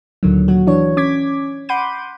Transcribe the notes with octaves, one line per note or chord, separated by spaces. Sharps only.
D2 A#2 D3 D#3 F#3
A#2 F#3 F#4
E3 D4 C#5
C#4 D6 G#6 B6
F#5 B5 C6 D6 G6 D#7